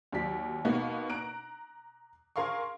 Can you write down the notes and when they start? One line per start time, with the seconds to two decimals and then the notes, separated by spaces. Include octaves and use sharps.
0.12 D#2 F#3 D5 B6
0.65 B2 A#3 B3 D#4
1.10 A#5 F#6 D7
2.36 G#4 A#4 F5 C6 C#6